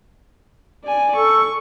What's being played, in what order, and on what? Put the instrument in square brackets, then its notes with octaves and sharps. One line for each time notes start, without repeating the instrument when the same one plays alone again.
[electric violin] D5 G#5
[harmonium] A4 [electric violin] C#6